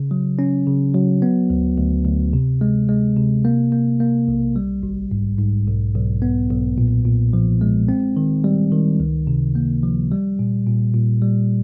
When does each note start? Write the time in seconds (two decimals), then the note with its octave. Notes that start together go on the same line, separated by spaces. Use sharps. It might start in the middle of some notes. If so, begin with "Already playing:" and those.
Already playing: C#3
0.11 F#3
0.39 C#4
0.67 C#3
0.95 F#3
1.22 B3
1.50 D2
1.78 D2
2.05 D2
2.33 C3
2.61 G#3
2.89 G#3
3.17 C3
3.45 A#3
3.72 A#3
4.00 A#3
4.28 B1
4.56 G3
4.83 G#1
5.11 G#2
5.39 G#2
5.67 B1
5.95 B1
6.22 B3
6.50 B1
6.78 A#2
7.06 A#2
7.33 F3
7.61 G#3
7.89 C4
8.17 D#3
8.44 G3
8.72 D#3
9.00 C#2
9.27 C3
9.55 A#3
9.83 F3
10.12 G3
10.39 A#2
10.67 A#2
10.95 A#2
11.22 G3